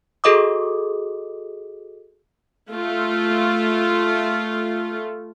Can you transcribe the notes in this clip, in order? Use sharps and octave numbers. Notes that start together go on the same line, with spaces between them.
F#4 G#4 A4 D#5 D6 D#6
A3 F4